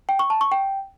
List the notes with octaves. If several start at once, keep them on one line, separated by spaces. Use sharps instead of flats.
G5
C#6
A5
C#6
G5